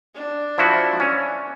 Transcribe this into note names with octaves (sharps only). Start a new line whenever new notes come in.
D4
F3 E4 F#4
C#4